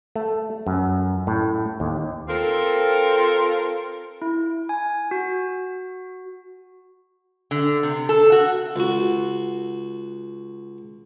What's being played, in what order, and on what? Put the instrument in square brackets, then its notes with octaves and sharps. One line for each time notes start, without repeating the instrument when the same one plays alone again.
[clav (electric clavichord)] A3
F#2
A2
D#2
[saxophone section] C4 F4 A4 A#4
[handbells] E4
G#5
F#4
[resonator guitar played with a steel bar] D3
C3
A4
F#4
[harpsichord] C#2 F#4